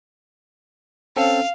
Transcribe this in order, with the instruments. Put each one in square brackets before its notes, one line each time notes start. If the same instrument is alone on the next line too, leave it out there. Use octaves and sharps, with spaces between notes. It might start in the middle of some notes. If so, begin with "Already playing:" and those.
[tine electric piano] C4 C#4 A4 [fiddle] F5